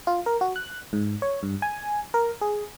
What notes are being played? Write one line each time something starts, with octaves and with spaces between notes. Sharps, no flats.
F4
A#4
F#4
F#6
G#2
C#5
G2
G#5
A#4
G#4